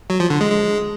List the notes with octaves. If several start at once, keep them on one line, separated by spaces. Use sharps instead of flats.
F#3
F3
D3
G#3
G#3